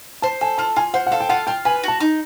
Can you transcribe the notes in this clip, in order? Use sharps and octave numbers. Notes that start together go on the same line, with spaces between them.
C5 A5
A4 G#5
F4 A5
F4 G#5
C5 F#5
F#5
A4 F5
G5
F4 F#5
F4 G5
B4 G#5
F#4 A5
D#4